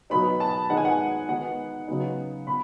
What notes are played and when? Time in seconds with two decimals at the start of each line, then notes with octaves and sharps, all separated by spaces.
0.10 B2 F#3 B3 D#4 B5
0.40 A5
0.70 D#3 G#3 B3 D#4 F#5
0.77 G#5
0.85 F#5
1.28 D#3 G#3 B3 D#4 F#5
1.88 C#3 F#3 B3 D#4
2.47 B2 B5